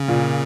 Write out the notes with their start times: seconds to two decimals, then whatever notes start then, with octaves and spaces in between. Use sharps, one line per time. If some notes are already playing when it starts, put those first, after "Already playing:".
Already playing: C#3
0.08 A#2